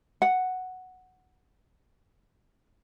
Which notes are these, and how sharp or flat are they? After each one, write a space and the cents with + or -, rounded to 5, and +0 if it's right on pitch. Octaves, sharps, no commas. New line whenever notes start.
F#5 +0